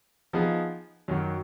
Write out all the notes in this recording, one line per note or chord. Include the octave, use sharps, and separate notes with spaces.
F3 B3 D#4 G#4
F#2 D#3 F#3